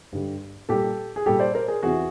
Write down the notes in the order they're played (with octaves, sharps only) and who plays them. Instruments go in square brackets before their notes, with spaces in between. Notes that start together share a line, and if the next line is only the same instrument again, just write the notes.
[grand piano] G2 D3 G3
A#2 G3 G4 A4
G#4
A#2 G3 G4 A4
C5 D5
A#4 C5
G#4 A#4
E2 C3 E3 F#4 G#4